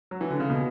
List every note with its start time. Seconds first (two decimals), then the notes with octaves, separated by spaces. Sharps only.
0.11 F#3
0.21 E3
0.31 D3
0.40 C#3
0.50 B2